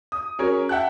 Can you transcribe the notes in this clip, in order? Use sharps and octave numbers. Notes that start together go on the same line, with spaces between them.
D#6
F#3 C#4 G#4 A#4 C#5
E5 F#5 G5 A5 F#6